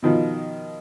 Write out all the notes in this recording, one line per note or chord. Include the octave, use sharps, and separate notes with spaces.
B2 D#3 F3